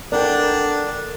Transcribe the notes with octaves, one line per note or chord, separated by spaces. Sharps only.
D4 A4 A#4 D5 F#5 G5